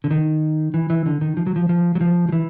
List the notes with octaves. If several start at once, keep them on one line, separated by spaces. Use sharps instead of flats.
D3
D#3
E3
E3
D3
D#3
F3
F#3
F3
F3
F#3
F3
F3
E3